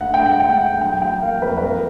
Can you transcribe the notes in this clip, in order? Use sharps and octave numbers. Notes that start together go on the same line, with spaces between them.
D2 F#5
G5
E1 F#5
E1 G5
F#5
D2
F#3 G5
F#3 G5
A#3 F5
A#4
F2 B4
B4
F2 A#4